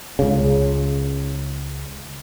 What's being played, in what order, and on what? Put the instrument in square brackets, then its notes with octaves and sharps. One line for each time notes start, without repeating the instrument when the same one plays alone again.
[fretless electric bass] C#2 C#3